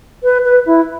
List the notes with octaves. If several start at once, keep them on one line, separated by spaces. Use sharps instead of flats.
B4
B4
E4